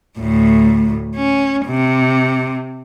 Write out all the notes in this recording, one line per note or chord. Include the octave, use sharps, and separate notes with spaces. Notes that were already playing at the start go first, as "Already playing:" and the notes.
D2 A2
C#4
C3